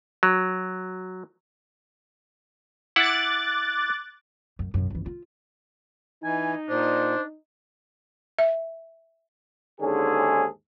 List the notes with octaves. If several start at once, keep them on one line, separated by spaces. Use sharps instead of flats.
F#3
E4 F#5 D6 F#6 A6
F#2
B1 F#2
F#1 E3
F4
E3 D#4 G#5
A#2 D4 C5
E5
D#2 G#2 D3 C#4 G#4 A4